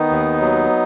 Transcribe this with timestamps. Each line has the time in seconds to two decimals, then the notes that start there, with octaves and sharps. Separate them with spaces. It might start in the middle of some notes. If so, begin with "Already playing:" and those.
Already playing: D#3 B3 D#4
0.11 D#2
0.41 F#3